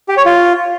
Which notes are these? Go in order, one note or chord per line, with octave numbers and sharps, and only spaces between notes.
G4
C#5
F4